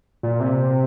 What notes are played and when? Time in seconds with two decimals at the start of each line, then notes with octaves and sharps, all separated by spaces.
0.23 A#2
0.40 C3